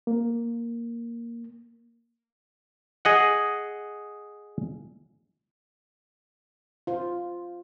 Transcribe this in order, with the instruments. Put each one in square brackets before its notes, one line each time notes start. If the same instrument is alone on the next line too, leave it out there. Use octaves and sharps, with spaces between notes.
[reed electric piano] A#3
[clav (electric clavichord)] G#4 D#5 F#5
[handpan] F4 C5